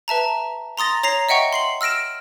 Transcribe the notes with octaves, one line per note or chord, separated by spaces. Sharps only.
B4 E5 A5 A#5
A#5 C6 D#6 A6 A#6
C#5 A#5 A#6 C7 F7
D#5 E5 F#5 G5 C#6
C6 C7 F#7
E6 F6 A#6 D7 E7